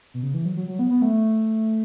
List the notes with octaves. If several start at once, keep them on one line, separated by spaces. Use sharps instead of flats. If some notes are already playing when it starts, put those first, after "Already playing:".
B2
C#3
E3
F#3
F#3
F#3
B3
B3
A3